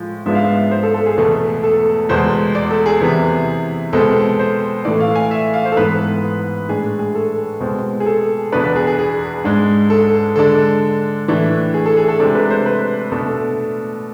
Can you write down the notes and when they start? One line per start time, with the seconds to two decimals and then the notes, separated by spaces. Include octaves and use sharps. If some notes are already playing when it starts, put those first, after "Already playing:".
Already playing: A2 F3 G#3
0.26 G#2 F3 G#3 B3 D4 E5
0.35 F5
0.44 E5
0.71 C5
0.83 A4
0.94 A4
1.06 G#4
1.18 E2 B2 A3
1.63 A4
2.09 E2 B2 G#3 C5
2.55 D5
2.71 A4
2.86 G#4
3.01 C3 E3 B3
3.93 B2 G#3 C4 A4
4.39 C5
4.85 A2 E3 A3 D5
5.00 F5
5.15 G#5
5.31 E5
5.54 F5
5.65 C5
5.72 A4
5.76 G#2 E3 B3 B4
6.69 A2 G#3 D4 G#4
6.99 G#4
7.15 A4
7.60 B2 G#3 C4
8.00 G#4
8.06 A4
8.52 E2 B2 B3 D4 B4
8.64 B4
8.76 G#4
8.87 G#4
8.99 G#4
9.44 G#2 G#3 D4
9.90 A4
10.36 D3 G#3 D4 A4
11.28 A2 E3 A3 D4
11.74 G#4
11.86 A4
11.97 G#4
12.08 A4
12.20 C3 G#3 D4 A4
12.35 B4
12.50 C5
12.66 B4
13.12 B2 A3 D4 A4